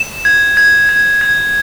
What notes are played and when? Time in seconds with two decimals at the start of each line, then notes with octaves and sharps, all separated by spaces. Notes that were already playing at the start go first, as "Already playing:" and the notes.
Already playing: E7
0.25 G#6
0.57 G#6
0.89 G#6
1.21 G#6